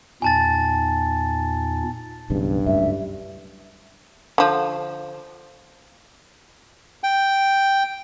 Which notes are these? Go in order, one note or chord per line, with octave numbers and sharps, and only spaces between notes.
E2 A#2 D#4 G#5 A5 A6
B1 G2 C#3 E3
C#2 F#2 A2 E5
D3 F3
G5